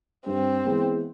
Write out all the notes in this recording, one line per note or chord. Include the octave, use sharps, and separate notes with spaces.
G2 C4
E3 G#3 B3